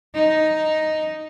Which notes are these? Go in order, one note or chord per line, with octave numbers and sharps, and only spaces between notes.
D#4